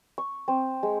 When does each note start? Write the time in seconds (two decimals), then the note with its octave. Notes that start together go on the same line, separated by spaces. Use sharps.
0.18 C#6
0.48 C4
0.83 G#3